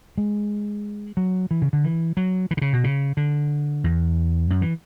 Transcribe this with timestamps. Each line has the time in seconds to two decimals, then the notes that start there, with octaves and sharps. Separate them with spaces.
0.18 G#3
1.17 F#3
1.51 E3
1.62 C#3
1.73 D3
1.84 E3
2.17 F#3
2.51 E3
2.57 D3
2.62 C#3
2.73 B2
2.84 C#3
3.17 D3
3.84 E2
4.50 F#2
4.62 E3